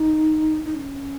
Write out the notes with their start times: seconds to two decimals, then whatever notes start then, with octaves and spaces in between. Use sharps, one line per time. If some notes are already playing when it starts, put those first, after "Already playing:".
Already playing: D#4
0.65 D#4
0.75 C#4